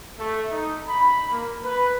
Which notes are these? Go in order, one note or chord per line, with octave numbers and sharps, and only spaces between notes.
A3
D#4
B5
A#3
B4